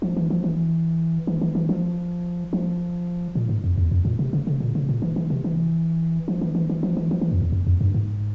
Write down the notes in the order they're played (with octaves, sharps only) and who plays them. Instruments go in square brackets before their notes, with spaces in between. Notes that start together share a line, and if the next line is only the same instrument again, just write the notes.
[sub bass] F3
E3
F3
E3
E3
E3
E3
F3
F3
A#2
G#2
F2
E2
F2
A#2
C3
C#3
C#3
A#2
C#3
A#2
E3
E3
C3
E3
F3
E3
E3
E3
F3
E3
F3
E3
F2
E2
F2
F2
G2
G#2